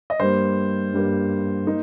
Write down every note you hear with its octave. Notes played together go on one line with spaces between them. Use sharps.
D#5
G2 G3 A#3 C5
G2 G3 A#3
A#3 D#4